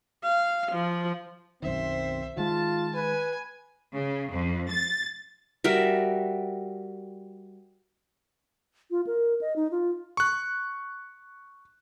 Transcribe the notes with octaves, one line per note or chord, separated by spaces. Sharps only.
F5
F3
B1 F#2 D#3 C4 C5 E5
D#3 G#3 F4 A5
B4 G#5
C#3
F2
A6
G3 F#4 A#4 E5
F4
A#4
D#5
D#4
F4
C#6 F#6